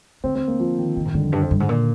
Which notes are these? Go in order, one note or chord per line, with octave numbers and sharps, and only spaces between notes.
D3 C4
C4
A#3
F3
D#3
C3 D#3
G#2
G2 D3
F2
G2
F2
G2
G#2
A#2